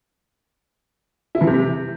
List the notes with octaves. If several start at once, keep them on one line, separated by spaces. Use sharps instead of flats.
E4
E3
C3